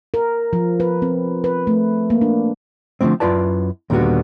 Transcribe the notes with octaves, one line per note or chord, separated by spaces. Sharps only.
A#4
F3
B4
C4
B4
A3
A#3
D4
D3 E3 F3 A3 C4
F#2 E4 F4 B4 D5 A5
D#2 A#2 D3 G3 B3 F#4